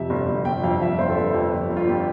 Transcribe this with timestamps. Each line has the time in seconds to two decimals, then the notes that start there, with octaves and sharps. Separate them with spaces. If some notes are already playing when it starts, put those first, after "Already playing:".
Already playing: F2 C3 E5
0.10 G1
0.29 G1
0.45 G1 G5
0.64 F2 F5
0.82 F2 E5
0.99 G1 C5
1.10 A4
1.17 G1 B4
1.34 F2
1.52 G1
1.70 G1
1.77 F4
1.87 G1 G4